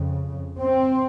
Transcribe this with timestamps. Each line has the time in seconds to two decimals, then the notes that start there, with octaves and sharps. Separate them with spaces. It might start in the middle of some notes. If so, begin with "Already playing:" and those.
Already playing: F2 C#3
0.60 C4